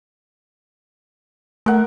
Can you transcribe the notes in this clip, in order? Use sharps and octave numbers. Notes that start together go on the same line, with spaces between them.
A3 A#4 F#5